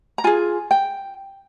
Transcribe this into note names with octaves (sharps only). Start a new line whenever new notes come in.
A#5
F4 G#4 G#5
G5